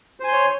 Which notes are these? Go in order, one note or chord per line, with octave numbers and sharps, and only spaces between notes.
C5 C#5 G#5 C6